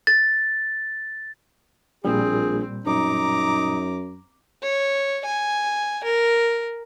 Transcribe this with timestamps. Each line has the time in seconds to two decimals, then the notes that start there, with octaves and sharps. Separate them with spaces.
0.07 A6
2.05 A#1 A#2 G3 C4 G#4
2.86 F#2 D#4 A#5 D6
4.63 C#5
5.25 G#5
6.04 A#4